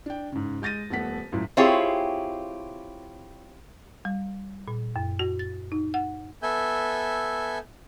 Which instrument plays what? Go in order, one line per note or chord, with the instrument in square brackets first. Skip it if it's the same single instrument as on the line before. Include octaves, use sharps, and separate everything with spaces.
[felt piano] D4 G5
G#2 C#3
G#3 G6 A6 A#6 D#7
D#1 A3 B3 F#5 B6
C#2 A2 F#3
[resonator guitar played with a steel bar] C4 E4 F4 G4 G#4 C#5
[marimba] G3
A#2
F#2
F#4
A6
D#4
F#5
[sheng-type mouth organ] B3 A4 E5 G#5 G6